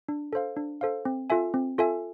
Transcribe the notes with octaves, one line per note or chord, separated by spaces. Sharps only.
D4
A4 C5 F5
D4
A4 C5 F5
C4
F4 A4 E5 G#5
C4
F4 A4 E5 G#5